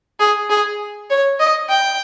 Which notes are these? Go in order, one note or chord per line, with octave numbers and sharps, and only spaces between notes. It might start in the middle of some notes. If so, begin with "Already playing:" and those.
G#4
G#4
C#5
D#5
G5